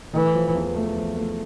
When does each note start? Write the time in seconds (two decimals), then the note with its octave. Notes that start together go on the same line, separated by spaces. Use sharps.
0.13 E3 A3
0.34 F3
0.55 E2
0.76 A3
0.97 F3
1.17 A3